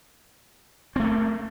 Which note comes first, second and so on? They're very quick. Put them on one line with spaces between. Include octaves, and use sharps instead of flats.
C4 A3 A#3